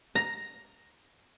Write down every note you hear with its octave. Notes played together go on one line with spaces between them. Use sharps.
A#5